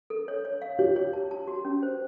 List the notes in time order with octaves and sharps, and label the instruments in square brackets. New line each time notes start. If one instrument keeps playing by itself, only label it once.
[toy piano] A4
C#5
C#5
F5
[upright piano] G4 [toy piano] C#5
[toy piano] C#5
A5
A5
F#4
C#4
C5